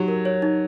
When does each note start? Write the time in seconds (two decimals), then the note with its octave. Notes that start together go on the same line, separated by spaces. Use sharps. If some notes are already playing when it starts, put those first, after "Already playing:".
Already playing: F#3 D#4 G4 C#5
0.08 A#4
0.25 C#5
0.42 D#4